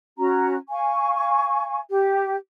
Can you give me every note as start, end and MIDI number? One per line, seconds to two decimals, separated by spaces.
0.18 0.56 61
0.18 0.56 66
0.18 0.56 82
0.69 1.79 77
0.69 1.79 80
0.69 1.79 85
1.90 2.35 67